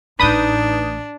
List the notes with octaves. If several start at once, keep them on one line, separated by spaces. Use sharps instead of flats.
A1 A2 D4 D#4 B4 D#6 G6